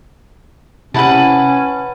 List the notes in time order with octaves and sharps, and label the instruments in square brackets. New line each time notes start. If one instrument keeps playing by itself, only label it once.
[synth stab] C3 E4 [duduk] C#4 [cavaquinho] B4 F#5 A5